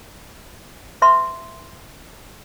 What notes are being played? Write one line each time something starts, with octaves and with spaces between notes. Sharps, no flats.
B4 E5 C6